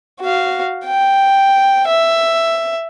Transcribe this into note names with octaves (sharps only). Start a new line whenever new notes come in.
F#4 F5
G5
E5